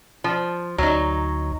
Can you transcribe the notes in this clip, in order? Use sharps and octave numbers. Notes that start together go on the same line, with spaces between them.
F3
D2 F#3 D#4